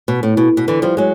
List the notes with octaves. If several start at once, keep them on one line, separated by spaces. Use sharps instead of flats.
B2
A2
B2
B2
D3 E3
F3 G3
F#3 G#3